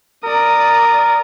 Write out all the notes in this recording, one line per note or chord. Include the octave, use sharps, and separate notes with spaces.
A#4 D5 D#6